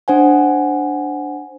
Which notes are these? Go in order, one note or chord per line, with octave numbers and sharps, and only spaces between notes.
D4 C5 F#5 G#5